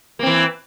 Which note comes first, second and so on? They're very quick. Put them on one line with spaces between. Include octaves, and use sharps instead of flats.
A#3 C4 E3